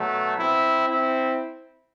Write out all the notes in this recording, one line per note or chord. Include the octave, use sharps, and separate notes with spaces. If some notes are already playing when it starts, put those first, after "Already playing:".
Already playing: B2 F#3 A3
C4 E4
C4 E4